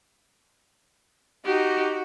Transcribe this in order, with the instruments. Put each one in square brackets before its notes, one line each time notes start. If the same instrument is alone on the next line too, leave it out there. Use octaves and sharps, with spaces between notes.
[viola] D#4 G4 [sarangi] F#4